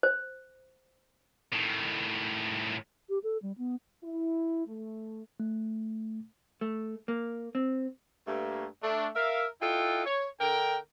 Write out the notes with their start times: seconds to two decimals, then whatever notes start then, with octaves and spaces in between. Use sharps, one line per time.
0.03 C5
1.53 A2 D#3
3.09 G4
3.24 A4
3.42 G3
3.58 B3
4.04 E4
4.66 A3
5.40 A3
6.61 A3
7.08 A#3
7.55 C4
8.28 G2 A3 A#3
8.83 A3 D4
9.16 A#4 E5 F5
9.61 E4 F4 A4 D#5 F#5 G5
10.06 C#5
10.41 D3 A#4 G5